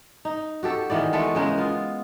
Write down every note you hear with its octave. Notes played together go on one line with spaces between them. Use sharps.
D#4
F#4 G4 A4
D#3 E3 B3 D5
G#3 A3 A4 B4
C#3 G#3 A#4
B3 F4